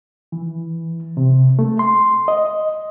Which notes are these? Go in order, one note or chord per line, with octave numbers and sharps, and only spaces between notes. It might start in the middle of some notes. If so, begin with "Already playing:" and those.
E3
C3
A3
C6
D#5